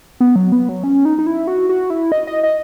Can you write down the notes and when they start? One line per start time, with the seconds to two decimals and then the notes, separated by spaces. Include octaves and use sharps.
0.20 B3
0.36 F#3
0.52 B3
0.69 F#3
0.84 C#4
1.05 D#4
1.19 D#4
1.27 E4
1.47 F#4
1.69 F#4
1.90 E4
2.12 D#5
2.27 D#5
2.43 D#5